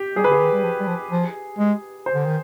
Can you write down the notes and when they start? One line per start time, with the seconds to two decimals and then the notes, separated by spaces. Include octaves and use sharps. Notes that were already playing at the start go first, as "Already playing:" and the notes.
Already playing: G4
0.16 G3 G#4
0.24 B4
0.29 D3 G#4
0.40 D#3
0.52 G3
0.64 F3
0.80 G3
0.87 F3
1.11 F3
1.59 G#3
2.06 C5
2.14 D3
2.26 D#3